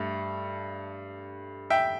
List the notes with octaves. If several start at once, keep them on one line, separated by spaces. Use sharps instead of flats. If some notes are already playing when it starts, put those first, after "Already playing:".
Already playing: G2 A3
E5 G5